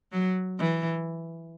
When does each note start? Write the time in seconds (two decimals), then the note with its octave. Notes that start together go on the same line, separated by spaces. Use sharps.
0.12 F#3
0.59 E3